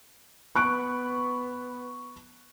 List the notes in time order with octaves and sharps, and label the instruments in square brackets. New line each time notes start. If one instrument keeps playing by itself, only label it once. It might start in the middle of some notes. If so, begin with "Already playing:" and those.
[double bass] B3 [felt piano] C#6 F#6 D7